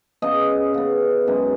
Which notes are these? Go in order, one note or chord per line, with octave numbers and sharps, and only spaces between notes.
C#3 B3 D#5
C#3 B3
F#2 D#3 G#3 B3